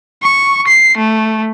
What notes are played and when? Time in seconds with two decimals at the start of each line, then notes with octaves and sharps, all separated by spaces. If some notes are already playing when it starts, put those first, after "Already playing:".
0.23 C#6
0.67 C7
0.97 A3